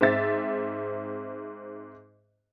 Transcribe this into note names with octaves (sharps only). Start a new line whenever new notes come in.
G#2 C4 E5 A6